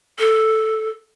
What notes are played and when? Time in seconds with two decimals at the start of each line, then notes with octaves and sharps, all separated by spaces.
0.19 A4